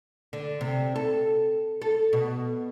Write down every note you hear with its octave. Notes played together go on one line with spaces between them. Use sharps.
D3
C3
A4
A4
B2